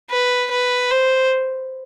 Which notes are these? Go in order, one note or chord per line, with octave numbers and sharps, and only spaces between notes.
B4
B4
C5